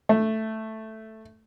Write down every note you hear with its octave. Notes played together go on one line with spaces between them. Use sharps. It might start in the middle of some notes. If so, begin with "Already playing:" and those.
A3